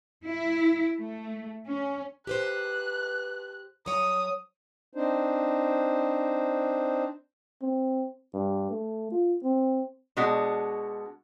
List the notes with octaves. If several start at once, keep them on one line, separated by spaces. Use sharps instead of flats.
E4
A3
C#4
G4 B4 C5 F#6
F#3 C#5 D#6
C4 D4 D#4 C5
C4
G2
A3
F4
C4
B2 G#3 D4 F#4